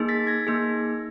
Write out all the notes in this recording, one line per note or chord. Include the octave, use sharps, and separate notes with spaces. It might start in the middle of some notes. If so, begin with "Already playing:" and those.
Already playing: A#3 D#4 G#4
A6 B6
G#6 A#6
A#3 D#4 G#4